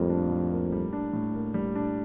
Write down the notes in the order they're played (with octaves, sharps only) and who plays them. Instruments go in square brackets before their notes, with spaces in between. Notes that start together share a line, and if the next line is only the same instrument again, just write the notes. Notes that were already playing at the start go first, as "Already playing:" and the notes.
Already playing: [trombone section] F2 [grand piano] A2 G3 A#3
[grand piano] D4
A2
A#3
G3
D4
A2
A#3
G3
D4